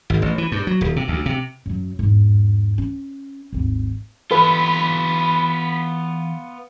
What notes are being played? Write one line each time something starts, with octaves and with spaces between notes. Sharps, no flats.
G#1
A1
E3
G2
F#3
D#1
C3
D2
C3
F#2 F#3
E2 G#2
C#4
G#1 D#2
E3 B3 F4 A4 B4 B5